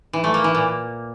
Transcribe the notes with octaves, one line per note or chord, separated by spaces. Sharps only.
E3
A3
A#3
E3
A#2